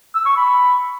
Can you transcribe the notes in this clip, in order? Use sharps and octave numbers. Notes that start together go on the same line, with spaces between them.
E6
C#6
B5